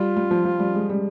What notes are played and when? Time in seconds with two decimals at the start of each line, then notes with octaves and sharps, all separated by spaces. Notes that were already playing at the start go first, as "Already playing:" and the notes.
Already playing: G3 F4
0.17 G3
0.31 F3
0.45 F3
0.59 G3
0.75 G#3
0.89 G3